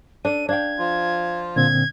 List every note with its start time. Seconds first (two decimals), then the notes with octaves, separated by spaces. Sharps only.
0.25 D4 A4 D#7
0.49 D4 F5 G5 G#6
0.79 F3 F4
1.56 A#2 D3 C4 G#6